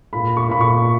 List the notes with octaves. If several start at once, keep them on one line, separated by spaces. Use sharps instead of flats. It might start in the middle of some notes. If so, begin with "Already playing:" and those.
A#2 B5
C#6
A#2 B5
C#6